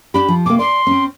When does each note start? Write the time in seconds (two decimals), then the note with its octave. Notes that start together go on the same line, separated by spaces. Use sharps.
0.14 D4 G4 B5
0.29 F3
0.46 C3 A#3 D6
0.59 D5 C6
0.87 C4 C#4